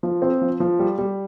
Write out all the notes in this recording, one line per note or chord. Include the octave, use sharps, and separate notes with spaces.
F3
C4
F3
F3
G3
G3